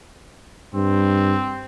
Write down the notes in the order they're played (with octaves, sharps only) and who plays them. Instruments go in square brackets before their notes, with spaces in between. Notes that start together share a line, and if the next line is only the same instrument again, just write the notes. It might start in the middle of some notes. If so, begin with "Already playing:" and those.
[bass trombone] G2 [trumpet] C4